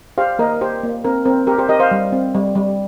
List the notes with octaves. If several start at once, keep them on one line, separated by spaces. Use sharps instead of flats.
G4 C5 F5
A#3 A#4 D#5
G4 C5
A#3
C4 A#4
C4 A#4
G4 A#4
G4 C5
G4 A#4 D#5
C5 F5
G3
C4
G3
G3